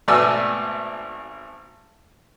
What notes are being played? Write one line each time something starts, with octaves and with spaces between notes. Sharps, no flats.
G#1 B2 A3 D5 G#5 E6